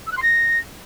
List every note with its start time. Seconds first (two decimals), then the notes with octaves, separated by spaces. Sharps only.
0.06 E6
0.12 F#6
0.17 C6
0.22 A#6